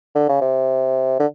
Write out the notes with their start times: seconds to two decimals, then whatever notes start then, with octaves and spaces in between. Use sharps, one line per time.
0.15 D3
0.29 C#3
0.41 C3
1.19 D3